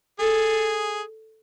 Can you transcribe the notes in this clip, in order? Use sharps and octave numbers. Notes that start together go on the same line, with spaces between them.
G#4 A4